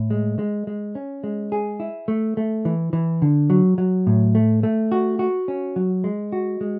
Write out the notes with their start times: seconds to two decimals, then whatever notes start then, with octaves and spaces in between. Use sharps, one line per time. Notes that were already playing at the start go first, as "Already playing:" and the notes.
Already playing: A2
0.10 G#3
0.39 G#3
0.67 G#3
0.95 C#4
1.24 G#3
1.52 G#4
1.80 E4
2.08 A3
2.37 A3
2.65 E3
2.93 E3
3.22 D3
3.50 F#3
3.78 F#3
4.07 A2
4.35 A3
4.63 A3
4.92 F#4
5.19 F#4
5.48 C#4
5.76 F#3
6.04 G#3
6.32 F#4
6.61 G#3